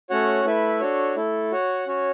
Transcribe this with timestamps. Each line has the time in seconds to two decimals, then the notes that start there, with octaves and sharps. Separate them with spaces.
0.10 A3 C#4 F#4 C#5 F#5
0.45 A3 E4 B4 E5
0.80 D4 F#4 A4 C#5
1.16 A3 E4 A4
1.52 F#4 C#5 F#5
1.87 C#4 F#4 C#5